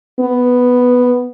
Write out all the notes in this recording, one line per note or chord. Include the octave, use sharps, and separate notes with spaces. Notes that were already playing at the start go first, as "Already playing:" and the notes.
B3